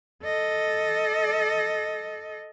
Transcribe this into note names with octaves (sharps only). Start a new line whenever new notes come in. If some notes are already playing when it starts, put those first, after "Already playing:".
A4 D#5